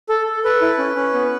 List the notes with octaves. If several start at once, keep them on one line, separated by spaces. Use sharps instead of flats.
A4
A4
A4 B4
E4
C#4
C#4
B3